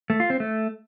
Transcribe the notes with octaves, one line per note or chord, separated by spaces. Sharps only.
A3
F4
C4
A3